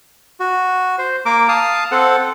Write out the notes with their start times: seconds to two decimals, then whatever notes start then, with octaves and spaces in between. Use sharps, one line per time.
0.40 F#4
0.98 C5
1.25 A#3 A#4 D6
1.48 F5 A5 D#6
1.91 C4 A4 F#5